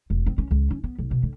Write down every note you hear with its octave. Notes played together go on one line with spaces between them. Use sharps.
E1
C4
C#4
C#2
C#4
B3
B1
B2
D3